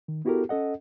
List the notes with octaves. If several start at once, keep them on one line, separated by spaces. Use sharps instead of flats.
D#3
B3 E4 F#4 G4 A4 A#4
C#4 A4 D#5 F#5